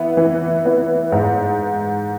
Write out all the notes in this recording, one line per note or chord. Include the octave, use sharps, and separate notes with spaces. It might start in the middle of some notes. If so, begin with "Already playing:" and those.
Already playing: E3 B3 E4
E3
B3 E4
G#2